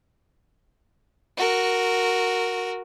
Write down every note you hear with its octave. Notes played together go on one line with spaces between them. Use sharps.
F#4 A#4